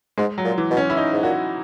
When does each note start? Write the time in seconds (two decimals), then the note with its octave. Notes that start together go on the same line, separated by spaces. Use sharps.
0.18 G#2 G#3
0.38 F#3
0.44 A#2
0.58 E3
0.70 B2
0.77 C#4
0.90 E4
0.97 D#4
1.12 G#2
1.23 A#2 F#4